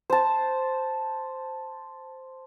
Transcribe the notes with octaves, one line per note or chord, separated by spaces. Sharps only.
C5 A5